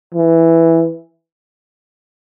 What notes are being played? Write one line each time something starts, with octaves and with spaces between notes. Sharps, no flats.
E3